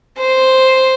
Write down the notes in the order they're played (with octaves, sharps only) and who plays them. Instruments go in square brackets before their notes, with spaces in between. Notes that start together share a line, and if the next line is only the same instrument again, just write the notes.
[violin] C5